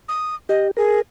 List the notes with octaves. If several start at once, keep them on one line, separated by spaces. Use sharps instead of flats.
D#6
G4 D#5
G#4 A#4